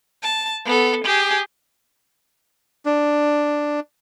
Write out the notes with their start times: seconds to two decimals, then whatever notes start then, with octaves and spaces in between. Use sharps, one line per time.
0.23 A5
0.65 B3 A4
1.05 G4 G#4
2.86 D4